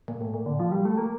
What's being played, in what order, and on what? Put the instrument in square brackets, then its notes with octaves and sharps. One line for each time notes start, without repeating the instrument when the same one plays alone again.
[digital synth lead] A#2
A2
A#2
D3
F3
G3
A3
A#3